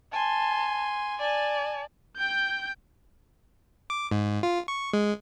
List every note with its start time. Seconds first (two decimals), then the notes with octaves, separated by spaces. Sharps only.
0.13 G#5 A5 C6
1.20 D5 G#5 A5
2.17 G5 G6
3.90 D6
4.11 G#2
4.43 F4
4.68 C#6
4.93 G#3